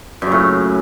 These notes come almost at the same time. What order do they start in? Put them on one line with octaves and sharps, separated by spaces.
F#2 C#3 A2